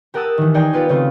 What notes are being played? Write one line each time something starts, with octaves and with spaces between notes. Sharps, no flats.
G4 A#4 F#5 A5 D#6 E6
D#3 E3
D#4 G#4 D5 G5 G#5 A#5
B3 F4 G4 B4
C#3 A3 C4 D#4 F4